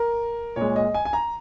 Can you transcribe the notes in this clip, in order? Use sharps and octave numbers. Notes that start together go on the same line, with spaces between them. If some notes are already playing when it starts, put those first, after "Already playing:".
Already playing: A#4
A#2 G#3 C#5
D#5
G#5
G#5
A#5